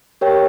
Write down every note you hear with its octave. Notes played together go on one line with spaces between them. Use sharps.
G4 A#4 C#5 G5